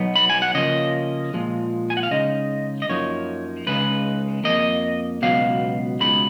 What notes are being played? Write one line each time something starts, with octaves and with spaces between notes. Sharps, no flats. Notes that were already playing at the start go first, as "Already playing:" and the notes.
Already playing: B2 F#3 B3 D#4
B5
G#5
F#5
C#3 F3 A#3 C#4 D#5
A#2 F3 G#3
G#5
F#5
F5
C#3 G#3 D#4 D#5
D#5
F#2 F3 A#3 D#4 C#5
C#2 C#3 G#3 D#4 B4
F2 D#3 A#3 D#5
C#2 B2 F#3 B3 F5
C#2 B2 G#3 D#4 B5